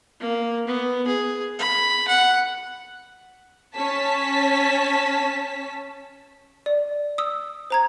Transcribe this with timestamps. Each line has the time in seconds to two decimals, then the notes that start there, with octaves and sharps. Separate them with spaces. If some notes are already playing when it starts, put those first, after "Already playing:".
0.20 A#3
0.67 B3
1.07 G#4
1.58 B5
2.08 F#5
3.74 C#4 A5 B6
6.66 D5
7.18 D#6 E6
7.70 C5 A#5 G#6